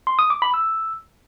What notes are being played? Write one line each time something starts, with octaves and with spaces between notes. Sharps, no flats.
C6
D#6
D6
B5
E6